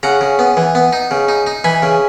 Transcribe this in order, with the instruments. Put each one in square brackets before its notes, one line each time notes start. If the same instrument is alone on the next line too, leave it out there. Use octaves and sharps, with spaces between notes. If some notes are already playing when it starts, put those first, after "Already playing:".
[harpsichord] C#3 F#5 A#5
C#3
B3
E3
B3
D#4
C#3
D#4
D#4
E3 G#5 B5
C#3